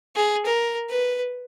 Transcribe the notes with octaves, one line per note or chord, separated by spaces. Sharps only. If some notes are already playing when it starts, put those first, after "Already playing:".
G#4
A#4
B4